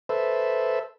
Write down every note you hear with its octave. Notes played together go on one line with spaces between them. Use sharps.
A4 B4 C5 E5